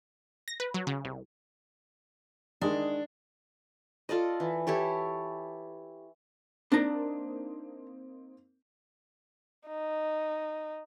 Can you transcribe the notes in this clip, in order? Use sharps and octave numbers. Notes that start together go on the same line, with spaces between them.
A#6
B4
F#3
C#3
C2
D#3 G#3 D4
F4 A4 D5 D#5
E3
E4 G4 A4 C#5
A#3 C4 D4 D#4 A#5
D#4